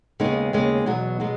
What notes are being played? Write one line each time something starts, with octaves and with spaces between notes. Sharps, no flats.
D#2 C#3 G#3 B3 D#4
D#2 C#3 G#3
E2 B2 F#3
B2 F#3 G#3 B3